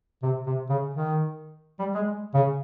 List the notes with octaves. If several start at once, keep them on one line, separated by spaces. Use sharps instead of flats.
C3
C3
C#3
D#3
G3
G#3
C#3